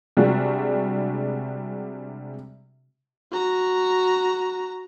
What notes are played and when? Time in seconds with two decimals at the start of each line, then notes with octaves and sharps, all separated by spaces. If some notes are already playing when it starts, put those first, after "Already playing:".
0.17 C3 G3 G#3 D4 F#4
3.31 F#4 A#5